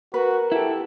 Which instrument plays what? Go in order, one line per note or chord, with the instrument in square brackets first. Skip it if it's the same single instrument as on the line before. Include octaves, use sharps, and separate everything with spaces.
[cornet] F#4 [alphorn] A#4 [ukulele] B4
[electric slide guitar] E4 G4 [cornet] A4